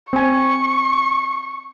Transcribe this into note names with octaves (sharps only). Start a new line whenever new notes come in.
C4 G#5 C#6